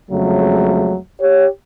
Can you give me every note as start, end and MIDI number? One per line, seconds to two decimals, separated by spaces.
0.11 0.97 41
0.11 0.97 49
0.11 0.97 54
0.11 0.97 56
0.11 0.97 57
1.21 1.47 67
1.21 1.47 73